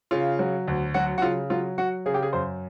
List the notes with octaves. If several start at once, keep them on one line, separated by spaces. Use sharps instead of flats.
C#3 F4
F#3
D2
F#3 F#4
F#4
C#3 F4
F#3 F4
F#3 F#4
C#3 G#4
G4
G#4
F#2 C5